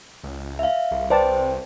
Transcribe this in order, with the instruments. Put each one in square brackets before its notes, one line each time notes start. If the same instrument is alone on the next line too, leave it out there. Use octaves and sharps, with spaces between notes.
[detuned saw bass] C#2
[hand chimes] E5 F5
[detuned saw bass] C2
[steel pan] B4 D5 A5 [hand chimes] C5 G5